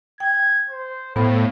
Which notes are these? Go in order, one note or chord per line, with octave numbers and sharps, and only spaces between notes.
G5 G#6
C5
A2 B3 C5 F5